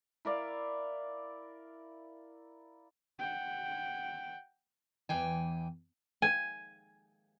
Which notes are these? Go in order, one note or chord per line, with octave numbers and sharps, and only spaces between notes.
E4 A#4 D5 F5
F#5 G5
E2 E3 G5 G#5
G#5